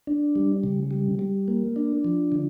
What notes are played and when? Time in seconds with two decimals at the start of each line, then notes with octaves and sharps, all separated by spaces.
0.07 D4
0.36 G3
0.64 C#3
0.91 G3
1.19 G3
1.48 A#3
1.76 D4
2.04 F3
2.32 D3